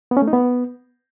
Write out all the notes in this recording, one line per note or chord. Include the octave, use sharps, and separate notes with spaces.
B3
C#4
A3
D#4
B3